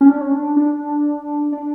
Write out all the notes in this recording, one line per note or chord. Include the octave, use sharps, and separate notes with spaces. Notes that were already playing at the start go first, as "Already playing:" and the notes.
C#4
D4
C#4
D4
D4
D4